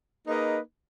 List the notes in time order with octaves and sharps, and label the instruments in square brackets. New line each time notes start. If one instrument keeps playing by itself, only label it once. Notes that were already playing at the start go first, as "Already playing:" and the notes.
[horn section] A#3 D#4 G#4 B4 D#5